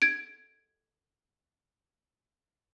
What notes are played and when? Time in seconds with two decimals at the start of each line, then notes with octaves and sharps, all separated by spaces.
0.02 G#6 D7